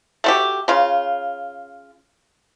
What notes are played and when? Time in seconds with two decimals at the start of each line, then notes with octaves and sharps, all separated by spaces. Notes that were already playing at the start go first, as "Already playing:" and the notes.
0.24 A3 F#4 G4
0.68 C#3 F4